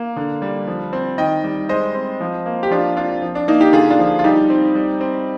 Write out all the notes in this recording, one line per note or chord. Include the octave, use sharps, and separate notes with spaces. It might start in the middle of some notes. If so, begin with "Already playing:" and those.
Already playing: A#3
D3
G3
F3
C4
D#3 D#5 G5
G3
G#3 C5 D#5
C4
F3
A#3
G4
F3 D4 F4
C4 D4 F4
F3
D4
A#3 D#4
D#4 G4
D3 F4 G#4
D4 F4
F3
F4
G3 D#4 G4
C4
G3
C4